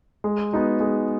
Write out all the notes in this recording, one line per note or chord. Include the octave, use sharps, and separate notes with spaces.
G#3
B3 D#4 F#4
G#3